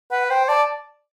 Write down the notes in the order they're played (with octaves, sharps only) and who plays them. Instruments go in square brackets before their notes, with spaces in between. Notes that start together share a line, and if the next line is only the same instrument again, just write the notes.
[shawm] B4 [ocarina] F#5
[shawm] C5 [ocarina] G5
[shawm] D5 [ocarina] A5